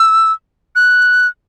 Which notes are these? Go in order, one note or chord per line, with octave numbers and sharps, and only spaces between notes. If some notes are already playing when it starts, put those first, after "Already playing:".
Already playing: E6
F#6